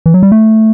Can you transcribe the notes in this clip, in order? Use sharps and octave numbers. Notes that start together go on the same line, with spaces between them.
E3
F#3
G3
A3